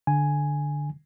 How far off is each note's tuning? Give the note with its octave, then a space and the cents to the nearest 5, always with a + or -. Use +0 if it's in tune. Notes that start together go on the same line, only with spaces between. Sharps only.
D3 +0 G#5 +0